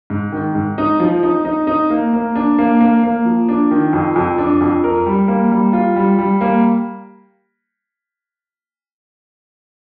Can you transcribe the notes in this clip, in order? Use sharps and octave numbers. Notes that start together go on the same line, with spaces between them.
G#2
D#3
G#2
D#4
F3
D#4
D#4
D#4
A#3
A#3
D4
A#3
A#3
A#3
F3
D4
D#3
F2
F2
D4
F2
A#4
G3
A#3
G3
F4
G3
G3
A#3